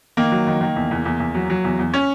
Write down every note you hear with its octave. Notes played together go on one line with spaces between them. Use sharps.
D#3 A#3
F#3
D#3
D#3
E2
E2
E2
E2
F#3
F#3
E2
E2
C#4